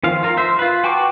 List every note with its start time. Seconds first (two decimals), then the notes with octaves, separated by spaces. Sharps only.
0.03 D#3 F3 F5
0.23 F4 A#4
0.37 C5 E5
0.59 F4 B4
0.84 F#4 G5 A5 C#6 D6